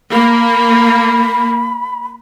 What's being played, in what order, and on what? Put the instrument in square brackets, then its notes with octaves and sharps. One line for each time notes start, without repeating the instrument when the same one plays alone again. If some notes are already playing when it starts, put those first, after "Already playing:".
[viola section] A#3 [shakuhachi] B5